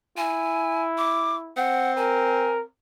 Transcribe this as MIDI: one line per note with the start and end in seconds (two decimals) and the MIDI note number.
0.17 1.55 64
0.17 0.83 80
0.98 1.36 86
1.57 2.66 60
1.57 1.93 78
1.97 2.61 70
1.97 2.52 80